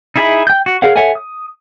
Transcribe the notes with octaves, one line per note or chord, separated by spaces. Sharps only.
D#4 E4 G#4 E5 B5
G5 G6
F#4
G#4 A#4 C#5 F5 F#5
A4 C#5 E5 F#5 G#5
D#6